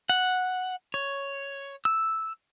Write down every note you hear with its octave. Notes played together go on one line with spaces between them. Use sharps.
F#5
C#5
E6